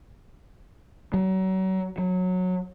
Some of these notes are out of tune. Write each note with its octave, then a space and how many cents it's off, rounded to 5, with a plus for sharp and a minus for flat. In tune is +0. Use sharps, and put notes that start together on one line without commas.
F#3 +35
F#3 -15